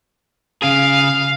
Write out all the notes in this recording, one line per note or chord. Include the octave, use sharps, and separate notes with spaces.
C#3 G#4 F5